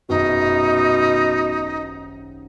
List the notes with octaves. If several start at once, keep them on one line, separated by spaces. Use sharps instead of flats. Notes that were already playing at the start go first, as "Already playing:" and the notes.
D#1 G#1 F#2 B2 D#4